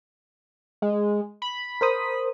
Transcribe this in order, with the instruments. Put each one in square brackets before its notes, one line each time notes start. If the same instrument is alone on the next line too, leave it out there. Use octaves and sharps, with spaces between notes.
[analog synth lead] G#3
B5
[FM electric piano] A#4 C5 D#6